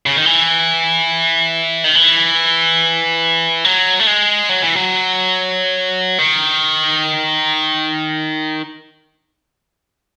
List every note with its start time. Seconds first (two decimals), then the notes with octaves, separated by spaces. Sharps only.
0.06 C#3
0.16 D#3
0.26 E3
1.84 D#3
1.95 E3
3.65 F#3
3.99 A3
4.07 G#3
4.49 F#3
4.62 E3
4.75 F#3
6.18 D#3